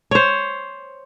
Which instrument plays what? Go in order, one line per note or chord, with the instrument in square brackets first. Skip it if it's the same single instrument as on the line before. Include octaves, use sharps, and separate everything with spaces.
[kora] C5 C#5